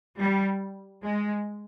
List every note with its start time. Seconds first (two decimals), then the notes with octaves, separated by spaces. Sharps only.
0.18 G3
1.03 G#3